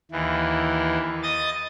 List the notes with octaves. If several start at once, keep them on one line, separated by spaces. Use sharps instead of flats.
D#2 E3
D#5 D#6 A6